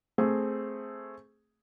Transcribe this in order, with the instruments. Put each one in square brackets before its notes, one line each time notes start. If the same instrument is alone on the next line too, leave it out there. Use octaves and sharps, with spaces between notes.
[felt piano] A3 C4 G#4